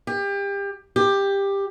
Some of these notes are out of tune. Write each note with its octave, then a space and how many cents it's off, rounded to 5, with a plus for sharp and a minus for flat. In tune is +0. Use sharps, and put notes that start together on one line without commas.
G4 +30
G4 +15